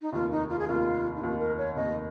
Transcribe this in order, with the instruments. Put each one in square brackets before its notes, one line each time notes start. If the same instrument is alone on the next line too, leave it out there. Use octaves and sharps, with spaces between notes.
[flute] D#4
[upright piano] F1 D#2 D#3 [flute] F4
[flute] D#4
F4
G#4
[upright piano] F1 D#2 D#3 [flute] F4
[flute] D#4
[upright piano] F1 D#2 D#3 [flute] F4
[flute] A#4
C#5
[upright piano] F1 D#2 D#3 [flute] D#5